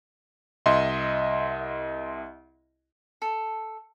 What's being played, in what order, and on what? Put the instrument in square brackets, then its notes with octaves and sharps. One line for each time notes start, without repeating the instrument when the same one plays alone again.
[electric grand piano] C2 D#5 E5 C6
[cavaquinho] A4